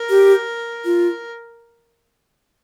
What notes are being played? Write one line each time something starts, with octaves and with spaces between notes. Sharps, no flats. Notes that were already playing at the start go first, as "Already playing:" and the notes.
Already playing: A#4
G4
F4